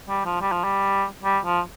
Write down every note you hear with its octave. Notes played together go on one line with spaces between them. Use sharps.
G3
F3
G3
F3
G3
G3
F3